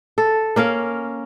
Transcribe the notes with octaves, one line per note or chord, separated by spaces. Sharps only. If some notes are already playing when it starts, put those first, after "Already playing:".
A4
A#3 C#4 A#4 F5